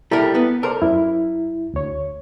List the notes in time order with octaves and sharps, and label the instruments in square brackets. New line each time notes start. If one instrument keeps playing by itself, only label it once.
[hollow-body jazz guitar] G3 A#4 [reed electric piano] E4 A4 A#5
[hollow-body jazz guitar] B3
[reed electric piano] A4 C5 D5 [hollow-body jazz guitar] A#4
[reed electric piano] F#2 E4
D2 C#5